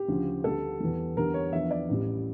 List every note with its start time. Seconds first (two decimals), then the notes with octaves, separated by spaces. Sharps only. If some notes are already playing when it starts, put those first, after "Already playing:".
Already playing: G4
0.08 D2 C#3 F3
0.44 D2 D3 G3 A4
0.80 E2 E3 G3
1.17 E2 D3 G3 A#4
1.34 C#5
1.52 E2 D3 F3 E5
1.71 D5
1.89 A1 A2 G3